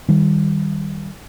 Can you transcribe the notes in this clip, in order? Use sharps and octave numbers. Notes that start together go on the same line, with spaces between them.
D#3 G3